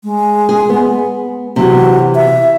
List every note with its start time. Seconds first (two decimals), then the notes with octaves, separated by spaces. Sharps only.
0.04 G#3
0.49 G#4
0.69 B3
1.56 C3 E3 F#3
2.15 E5